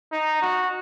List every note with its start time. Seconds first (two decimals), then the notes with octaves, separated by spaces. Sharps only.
0.12 D#4
0.42 F#4